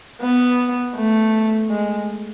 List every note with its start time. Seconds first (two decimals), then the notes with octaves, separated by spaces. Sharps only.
0.21 B3
0.96 A3
1.70 G#3